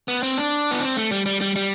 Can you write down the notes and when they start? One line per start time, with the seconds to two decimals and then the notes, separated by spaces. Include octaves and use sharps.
0.08 B3
0.23 C4
0.38 D4
0.71 B3
0.81 C4
0.97 A3
1.12 G3
1.26 G3
1.41 G3
1.56 G3